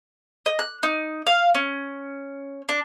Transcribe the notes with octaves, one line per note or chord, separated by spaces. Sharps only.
D#5
F#6
D#4
F5
C#4
D4